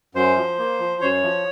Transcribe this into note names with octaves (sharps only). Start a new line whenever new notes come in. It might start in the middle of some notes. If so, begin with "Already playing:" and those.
F#2 C5
F3
A#3
F3
F#2 C#5
F3